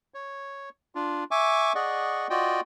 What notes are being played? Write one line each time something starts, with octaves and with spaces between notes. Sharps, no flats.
C#5
D4 F4
E5 G#5 C#6 D6
G#4 D5 D#5 F#5 C#6
F4 F#4 D5 D#5 G5